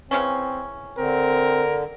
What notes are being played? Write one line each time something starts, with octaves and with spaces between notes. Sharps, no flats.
C#3 E3 C4 C#4
D3 C4 A#4